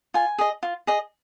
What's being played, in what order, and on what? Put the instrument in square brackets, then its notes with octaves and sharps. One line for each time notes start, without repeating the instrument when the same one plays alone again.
[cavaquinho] F4 G#5
G#4 D#5
F4
G#4 D#5